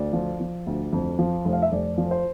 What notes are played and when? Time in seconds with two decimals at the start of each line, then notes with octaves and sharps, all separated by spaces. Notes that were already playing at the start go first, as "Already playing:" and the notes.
Already playing: D2 D5
0.13 F3
0.40 F3
0.66 D2
0.93 F2
1.19 F3
1.45 F1
1.53 F5
1.62 E5
1.72 F1 D5
1.98 F3
2.11 C5